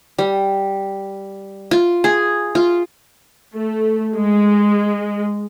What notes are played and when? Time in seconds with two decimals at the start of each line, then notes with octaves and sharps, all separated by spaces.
0.18 G3
1.71 F4
2.04 G#4
2.55 F4
3.54 A3
4.16 G#3